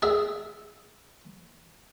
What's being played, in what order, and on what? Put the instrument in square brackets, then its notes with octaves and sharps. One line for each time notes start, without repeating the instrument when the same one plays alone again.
[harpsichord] G#4 E5